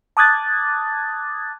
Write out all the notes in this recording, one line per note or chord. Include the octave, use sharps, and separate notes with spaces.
A5 D6 D#6 F#6 G#6 A6